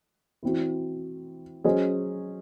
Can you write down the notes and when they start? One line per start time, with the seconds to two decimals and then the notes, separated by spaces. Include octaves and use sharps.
0.43 E3 C4 F#4
1.64 F#3 C#4 G#4 C5 D#5